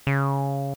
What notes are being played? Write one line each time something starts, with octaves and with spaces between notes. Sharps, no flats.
C#3